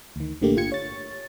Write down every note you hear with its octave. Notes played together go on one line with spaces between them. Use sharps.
D2 D#3
A1 D3 A3 A#3 G4
G1 F4 G5 G#6 C#7
C#5 A6